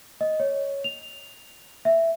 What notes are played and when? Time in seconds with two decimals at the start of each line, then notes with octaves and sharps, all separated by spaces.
0.21 D#5
0.40 C#5
0.84 F7
1.85 E5